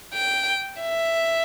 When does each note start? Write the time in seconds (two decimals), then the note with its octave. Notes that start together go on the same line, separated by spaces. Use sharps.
0.14 G5
0.81 E5